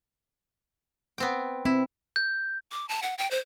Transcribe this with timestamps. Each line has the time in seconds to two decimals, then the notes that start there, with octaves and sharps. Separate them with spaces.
1.18 B3 C4 G5
1.65 C4 E4
2.16 G6
2.72 D6
2.89 A5
3.03 F#5
3.18 G5
3.31 C5